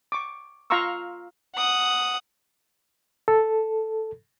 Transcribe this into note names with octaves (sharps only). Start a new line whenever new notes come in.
C#6 D6
F4 F5 A#5 C6 C#6 E6
F#5 D#6
A4